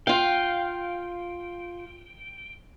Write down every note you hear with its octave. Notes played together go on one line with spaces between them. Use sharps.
F4 F5 G5